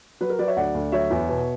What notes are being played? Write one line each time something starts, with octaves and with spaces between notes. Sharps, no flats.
F#3 B4
A#4
F#3 B4 D5
C#5 E5
D2 D5 F#5
D2
F#3 C#5 E5
E2
B2